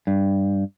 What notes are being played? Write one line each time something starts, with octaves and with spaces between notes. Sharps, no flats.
G2